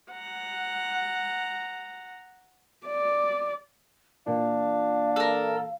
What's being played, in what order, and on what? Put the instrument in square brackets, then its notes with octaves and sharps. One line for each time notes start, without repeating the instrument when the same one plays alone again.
[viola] F#5 A#5
[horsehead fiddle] D5
[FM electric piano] A#2 E3 [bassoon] D4 [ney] F5
[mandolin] A4 A#4